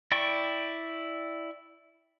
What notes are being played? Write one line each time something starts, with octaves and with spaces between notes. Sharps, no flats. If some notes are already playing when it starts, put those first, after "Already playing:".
E4 D5 G5 C#6